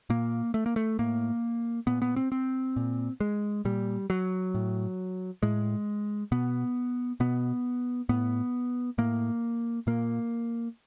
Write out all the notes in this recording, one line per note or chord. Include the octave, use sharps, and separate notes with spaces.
A#2 A#3
A3
A#3
A3
A2 A#3
A#2 B3
B3
C4
C4
A#2
G#3
A#2 G3
F#3
A2
A2 G#3
B2 B3
B2 B3
A2 B3
A2 A#3
A#2 A#3